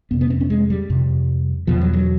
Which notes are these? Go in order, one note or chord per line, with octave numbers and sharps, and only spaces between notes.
F2 C3 B3
B3
C4
C#4
G#3
G3
F2 C3
E2 B2 F3
F#3
F#3